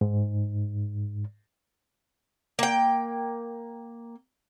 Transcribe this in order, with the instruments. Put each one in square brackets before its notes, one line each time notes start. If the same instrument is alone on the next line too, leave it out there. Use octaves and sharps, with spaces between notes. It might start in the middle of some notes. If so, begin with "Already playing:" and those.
[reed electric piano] G#2
[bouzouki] A#3 G5